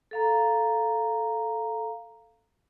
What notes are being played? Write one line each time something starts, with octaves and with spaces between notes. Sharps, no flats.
A4 F5 A#5